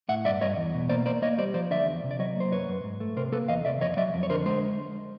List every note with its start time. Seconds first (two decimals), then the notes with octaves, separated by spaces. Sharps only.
0.09 A2 E5 F#5
0.25 G2 D5 E5
0.41 G2 C#5 D#5
0.57 E2
0.74 B2
0.89 A#3 C5 D5
1.06 A#3 C5 D5
1.22 A#3 C#5 D#5
1.38 G3 C5 D5
1.54 F3 C5 D5
1.70 D3 D5 E5
1.87 E2
2.03 C3
2.11 D5
2.19 F#3 C#5 D#5
2.36 A#3 C5
2.52 F#2 B4 C#5
2.68 F#2
2.84 G#2
3.00 A3
3.16 C3 A#4 C5
3.32 A#3 A4 B4
3.48 E2 D#5 F5
3.65 C3 D5 E5
3.81 F2 C#5 D#5
3.97 F#3 D5 E5
4.14 F2
4.23 C#5
4.30 D3 A#4 C5
4.46 G#3 C5